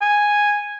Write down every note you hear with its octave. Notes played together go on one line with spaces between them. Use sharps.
G#5